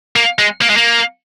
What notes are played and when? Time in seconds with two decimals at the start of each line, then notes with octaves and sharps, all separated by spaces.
0.16 A#3
0.39 G#3
0.62 A#3
0.70 G#3
0.77 A#3